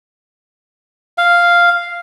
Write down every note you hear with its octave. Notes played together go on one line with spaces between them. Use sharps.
F5